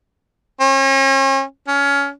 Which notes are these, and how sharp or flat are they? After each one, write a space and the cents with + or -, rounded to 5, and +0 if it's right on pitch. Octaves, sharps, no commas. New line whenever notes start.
C#4 -40
C#4 +20